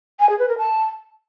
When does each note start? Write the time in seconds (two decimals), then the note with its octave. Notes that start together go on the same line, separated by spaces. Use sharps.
0.20 G#5
0.29 G#4
0.39 B4
0.48 A#4
0.58 A5